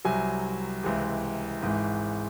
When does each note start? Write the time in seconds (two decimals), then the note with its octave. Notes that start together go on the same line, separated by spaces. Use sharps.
0.05 C2 C3 F#3 G#5
0.83 C#2 C3 E3
1.62 G#1 G#2 E3